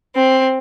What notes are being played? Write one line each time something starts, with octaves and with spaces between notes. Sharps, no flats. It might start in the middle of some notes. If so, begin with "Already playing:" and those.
C4